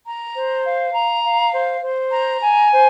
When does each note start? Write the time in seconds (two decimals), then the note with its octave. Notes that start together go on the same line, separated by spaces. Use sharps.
0.06 A#5
0.35 C5
0.65 F5
0.93 A#5
1.23 F5
1.52 C5
1.81 C5
2.11 A#5
2.41 G#5
2.71 C5